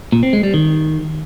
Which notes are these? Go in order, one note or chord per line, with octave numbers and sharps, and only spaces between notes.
A#2
C4
G#3
G3
D#3